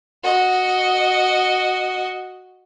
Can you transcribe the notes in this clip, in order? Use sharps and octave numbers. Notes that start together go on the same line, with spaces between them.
F#4 D#5